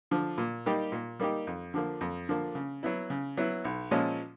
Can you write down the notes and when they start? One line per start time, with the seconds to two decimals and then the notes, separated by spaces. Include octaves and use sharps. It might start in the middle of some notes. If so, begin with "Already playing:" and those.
0.11 D3 F3
0.38 A#2
0.66 G3 A#3 D#4 G4
0.92 A#2
1.19 G3 A#3 D#4 G4
1.47 F2
1.74 D3 F3 A#3
2.01 F2
2.29 D3 F3 A#3
2.55 C#3
2.83 F#3 B3 E4
3.10 C#3
3.37 F#3 B3 E4
3.65 B1
3.91 A#2 F3 G#3 C#4